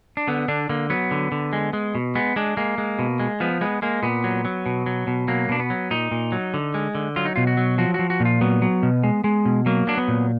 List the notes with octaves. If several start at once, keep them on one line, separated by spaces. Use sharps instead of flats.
D4
D3 B3
D3 D4
D3 A#3
F#3 B3
D3
D3
G#3
G#3
B2
G#3 B3
G#3 D4
G#3 A#3
G#3
B2
G#3
F3 B3
G#3 B3
G#3 A#3
A#2 B3
F#3
F#3
B2
F#3
B2
F#3 A#3
B2 D4
B3
F#3
A#2 D#4
A#2
F#3
D3
G#3
D3
F#3 F4
D#4
B2 F4
F#4
F#3
F3 F#4
F3 F#4
F#4
A#2
F4
F#3 B3
F#3
B2
G#3
G#3
B2
F#3 A#3
F#3 D4
B3
A#2